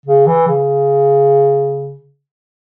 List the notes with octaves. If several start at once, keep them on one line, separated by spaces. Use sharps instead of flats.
C#3
E3
C#3